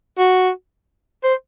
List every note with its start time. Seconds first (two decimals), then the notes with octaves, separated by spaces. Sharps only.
0.18 F#4
1.23 C5